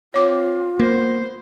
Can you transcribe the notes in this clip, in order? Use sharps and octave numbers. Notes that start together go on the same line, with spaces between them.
C4 F4 C#5 D6
A#3 B3 C5